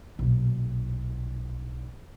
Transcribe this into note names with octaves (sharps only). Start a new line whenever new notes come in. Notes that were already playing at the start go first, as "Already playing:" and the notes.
B1 A#2